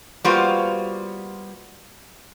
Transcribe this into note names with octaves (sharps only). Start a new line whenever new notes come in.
G3 A#3 B3 F4 F#4 C5